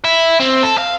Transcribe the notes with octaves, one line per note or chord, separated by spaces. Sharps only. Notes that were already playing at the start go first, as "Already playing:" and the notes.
E4
C4
A4
F5